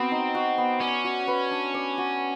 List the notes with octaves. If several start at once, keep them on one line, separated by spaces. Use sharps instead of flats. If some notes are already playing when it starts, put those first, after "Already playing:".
Already playing: B3 C4 F#4
D#4
F#4
B3
C#4 D5
F#4
B4
D4
D5
F#4